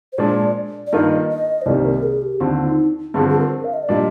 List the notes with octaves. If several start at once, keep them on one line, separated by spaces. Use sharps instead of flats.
C5
A#2 F3 G#3 D4 D5
D5
G2 D#3 A#3 F4 D#5
D#5
C5
C2 C3 D#3 G3 A#3 D5
A#4
G#4
G4
D#2 D3 F3 C4 F4
D#4
G2 D3 F3 C4 G#4
G#4
A#4
F5
D#5
D5
A#2 G3 D4 D#5